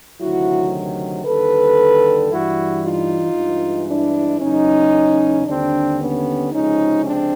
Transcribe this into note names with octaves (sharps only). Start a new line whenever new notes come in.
D2 C3 D#3 F#3 E4 F#4
D#2 D3 G3 A4 B4
G2 E3 G3 E4 F#4
D#4 F4
G2 E3 G#3
D4 E4
F#1 E2 C#3 F#3 C#4 D#4
D#2 D3 G3 C4 D4
B3 C#4
C#2 C3 F3 G#3 C#4 D#4
C4 D4